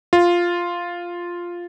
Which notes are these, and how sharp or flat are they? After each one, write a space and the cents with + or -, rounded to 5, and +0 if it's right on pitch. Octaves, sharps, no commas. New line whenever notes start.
F4 +0